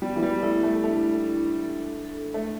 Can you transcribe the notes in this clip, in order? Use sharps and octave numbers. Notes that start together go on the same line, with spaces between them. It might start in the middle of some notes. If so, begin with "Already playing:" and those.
G3 B3
E3
G3
A3 E4
A3
A3 D4
D4
A4
A4
A3